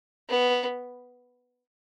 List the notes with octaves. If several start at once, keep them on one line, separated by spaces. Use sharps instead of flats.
B3